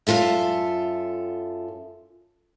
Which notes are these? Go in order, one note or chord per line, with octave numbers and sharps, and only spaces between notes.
F#2 B2 F4 A4 E5